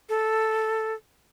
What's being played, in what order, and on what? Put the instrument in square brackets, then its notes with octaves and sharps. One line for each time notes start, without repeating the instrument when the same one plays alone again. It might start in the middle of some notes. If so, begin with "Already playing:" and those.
[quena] A4